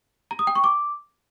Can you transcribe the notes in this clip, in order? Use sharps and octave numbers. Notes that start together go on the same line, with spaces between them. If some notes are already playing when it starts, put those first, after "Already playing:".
A#5
D#6
G5
C#6
D6